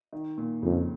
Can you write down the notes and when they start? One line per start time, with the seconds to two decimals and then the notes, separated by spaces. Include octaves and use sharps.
0.13 D#3
0.38 A#2
0.62 F2 C#3